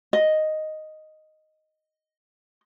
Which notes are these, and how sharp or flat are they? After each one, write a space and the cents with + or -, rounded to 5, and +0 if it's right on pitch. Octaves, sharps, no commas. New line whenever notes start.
D#5 +0